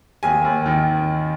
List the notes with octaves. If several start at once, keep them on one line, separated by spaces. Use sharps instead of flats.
D#2 G#5
D#2
D#3